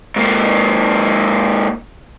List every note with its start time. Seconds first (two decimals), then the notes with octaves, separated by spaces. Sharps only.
0.16 G#2 A#3